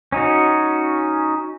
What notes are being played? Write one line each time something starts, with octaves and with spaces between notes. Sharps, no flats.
C#4 D#4 F#4